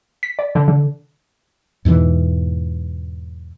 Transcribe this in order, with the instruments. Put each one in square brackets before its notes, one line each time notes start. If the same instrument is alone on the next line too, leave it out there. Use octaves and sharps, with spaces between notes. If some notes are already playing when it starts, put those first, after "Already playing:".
[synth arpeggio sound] B6
D5
D3
D3
[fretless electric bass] E2 G#2 B2 E3